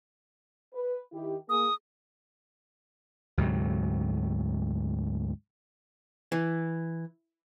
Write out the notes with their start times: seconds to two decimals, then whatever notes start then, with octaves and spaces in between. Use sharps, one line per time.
0.73 B4
1.12 D#3 E4 G4
1.49 A#3 G#4 D#6
3.37 D2 G#2 C3 F#3
6.32 E3